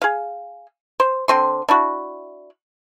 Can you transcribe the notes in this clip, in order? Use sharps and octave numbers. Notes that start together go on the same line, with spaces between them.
G#4 F5
C5
D3 C4 C6
D4 E4 F#4